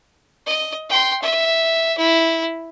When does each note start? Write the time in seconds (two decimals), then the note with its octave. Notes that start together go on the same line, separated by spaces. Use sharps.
0.47 D#5
0.90 G5 C6
1.22 E5
1.98 E4